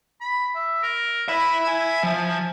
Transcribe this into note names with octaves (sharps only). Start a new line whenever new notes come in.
B5
E5
A#4
B4 E5 B5
G#5
F3